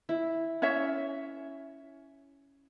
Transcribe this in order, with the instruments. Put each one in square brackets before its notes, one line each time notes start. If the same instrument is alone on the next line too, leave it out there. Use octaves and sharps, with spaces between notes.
[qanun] E4
[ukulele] C#4 C#5 E5